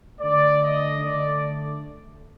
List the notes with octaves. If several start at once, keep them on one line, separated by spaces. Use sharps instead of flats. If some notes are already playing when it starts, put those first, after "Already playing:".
D3 A3 D5
D#5
D3 A3 D5